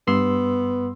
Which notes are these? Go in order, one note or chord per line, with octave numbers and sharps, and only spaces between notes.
G2 B3 C6 E6